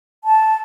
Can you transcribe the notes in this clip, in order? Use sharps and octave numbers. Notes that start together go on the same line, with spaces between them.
A5